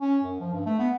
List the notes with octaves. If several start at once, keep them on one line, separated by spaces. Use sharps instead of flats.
C#4
F#2
F3
G2
A3
B3